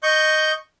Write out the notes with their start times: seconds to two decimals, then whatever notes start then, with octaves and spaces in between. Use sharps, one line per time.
0.03 D#5 C#6 G6